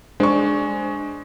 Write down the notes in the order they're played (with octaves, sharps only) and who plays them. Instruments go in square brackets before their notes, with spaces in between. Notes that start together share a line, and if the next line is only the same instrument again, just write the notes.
[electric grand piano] G#3 [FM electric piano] D4 [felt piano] C5 D5 C#6